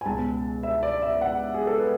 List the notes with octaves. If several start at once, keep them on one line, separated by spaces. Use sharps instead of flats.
G#5
C#2 B2 A5
E5
D5
E5
F#5
G#4
A4
B4